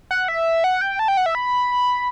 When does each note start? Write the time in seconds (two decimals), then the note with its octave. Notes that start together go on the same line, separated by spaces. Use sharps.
0.11 F#5
0.28 E5
0.64 F#5
0.81 G5
0.99 A5
1.08 G5
1.17 F#5
1.26 E5
1.35 B5